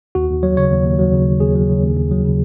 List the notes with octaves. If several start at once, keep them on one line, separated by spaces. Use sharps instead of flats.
D#2 F#4
D#2
F#3 C#5
C#3 C#5
D#2
D#2
F#3
C#3
D#2
D#2 G#4
F#3
C#3
D#2
D#2
F#3
C#3